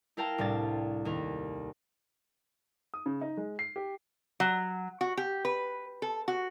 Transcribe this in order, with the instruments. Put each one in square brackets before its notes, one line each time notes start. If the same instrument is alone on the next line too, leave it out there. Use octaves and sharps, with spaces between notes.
[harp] E4 A#4 F5 G5 A5 A#5
C2 A2 C4 D4 A6
D#2 A#4
[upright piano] D#6
C#3
D#4
G#3
C7
G4
[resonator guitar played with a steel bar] F#3
F#4
G4
B4
A4
F#4